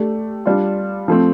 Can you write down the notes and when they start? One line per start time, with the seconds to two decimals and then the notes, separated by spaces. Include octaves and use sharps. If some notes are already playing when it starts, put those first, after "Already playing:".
Already playing: A3 D4 G4
0.45 G3 D4 F4
1.08 F3 A3 C4